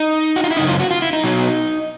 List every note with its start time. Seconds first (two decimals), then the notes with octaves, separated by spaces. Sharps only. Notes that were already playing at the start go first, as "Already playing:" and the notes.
Already playing: D#4
0.36 F#4
0.44 F4
0.51 E4
0.57 F#2 C#3 D#4
0.68 F4
0.80 F#4
0.91 F4
1.02 E4
1.13 D#4
1.23 B2 F#3